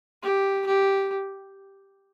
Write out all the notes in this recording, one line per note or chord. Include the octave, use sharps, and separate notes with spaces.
G4
G4